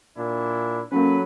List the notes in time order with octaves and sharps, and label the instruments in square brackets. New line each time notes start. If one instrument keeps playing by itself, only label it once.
[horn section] A#2 D4 E4
[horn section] F#3 A4 B4 [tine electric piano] A#3 C#4